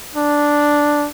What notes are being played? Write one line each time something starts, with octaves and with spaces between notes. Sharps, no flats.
D4